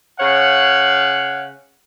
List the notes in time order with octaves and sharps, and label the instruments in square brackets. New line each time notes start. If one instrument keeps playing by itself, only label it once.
[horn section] C#3 C#5 F5 F#5